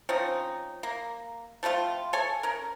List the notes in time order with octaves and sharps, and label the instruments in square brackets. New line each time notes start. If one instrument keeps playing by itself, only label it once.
[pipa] F3 C4 C#4 D#4
A#3
F3 A3 C4 F4
A4 C#5 G#5
C#4 A#4